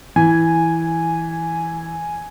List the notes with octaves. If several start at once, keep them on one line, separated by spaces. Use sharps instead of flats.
E3 G#5